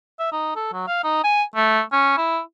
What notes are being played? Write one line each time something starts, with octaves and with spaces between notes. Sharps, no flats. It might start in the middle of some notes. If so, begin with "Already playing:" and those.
E5
D#4
A4
F#3
F5
D#4
G#5
A3
C#4
E4